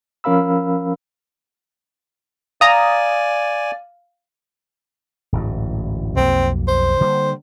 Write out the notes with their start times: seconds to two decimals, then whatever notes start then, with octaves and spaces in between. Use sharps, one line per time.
0.24 F3 C#4 A#4 F5 B5 E6
2.61 D5 F5 G#5 A#5 D#6
5.32 D1 A1 G#2
6.17 B1 F2 A#3 C4
6.68 C5
7.01 D3 G3 A#3